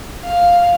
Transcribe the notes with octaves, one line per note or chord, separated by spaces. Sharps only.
F5